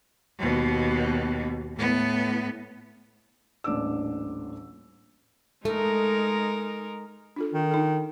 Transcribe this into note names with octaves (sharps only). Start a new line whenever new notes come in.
D#2 B2
A2 B3
D#1 A1 D4 D6 E6
G#3 A3 D#4 A#4
D4 F4 A4
D#3
D#4 A4